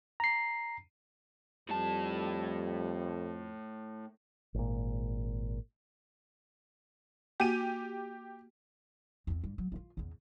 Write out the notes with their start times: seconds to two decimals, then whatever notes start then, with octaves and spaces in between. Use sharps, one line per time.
0.20 A#5 C7
1.69 F2 A2 G3 A5
4.54 G#1 A#2
7.40 A#3 F#4 G4 G#5 D#7
9.27 E2 C4
9.44 G2
9.58 F#3
9.72 G2 F4
9.97 E2 C#3